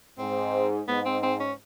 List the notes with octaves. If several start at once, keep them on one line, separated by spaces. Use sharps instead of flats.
G#2 C4
G#2 B3
C4
C4
C#4